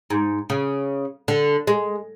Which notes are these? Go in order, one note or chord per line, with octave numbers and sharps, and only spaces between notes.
G#2
C#3
D3
G#3